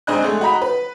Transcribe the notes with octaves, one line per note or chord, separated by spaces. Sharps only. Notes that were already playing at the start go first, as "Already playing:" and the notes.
G#2 C4 D4 D#5 G#5 F#6
G#3 A3 G#4
F#4 D#5 A#5 B5
B4